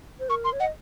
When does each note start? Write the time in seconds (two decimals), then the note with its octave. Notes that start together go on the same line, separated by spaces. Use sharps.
0.20 C5
0.29 A#4 C#6
0.44 C6
0.53 C#5
0.60 D#5 F#5